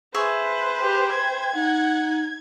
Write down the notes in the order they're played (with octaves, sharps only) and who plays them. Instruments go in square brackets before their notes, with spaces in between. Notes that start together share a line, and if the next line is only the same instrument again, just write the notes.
[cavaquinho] G#4 E5 C#6 [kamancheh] B4 C5
[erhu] G4 [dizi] G5
[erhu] G#6
[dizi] D#4 [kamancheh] F#5